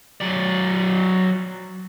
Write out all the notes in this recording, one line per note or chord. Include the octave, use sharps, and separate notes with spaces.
F#3 D5